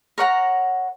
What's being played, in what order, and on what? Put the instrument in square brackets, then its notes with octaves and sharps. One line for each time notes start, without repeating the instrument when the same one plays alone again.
[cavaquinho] A#4 C#5 F#5 A#5